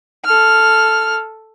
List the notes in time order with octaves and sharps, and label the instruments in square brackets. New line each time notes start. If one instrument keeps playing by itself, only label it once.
[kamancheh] A4 F6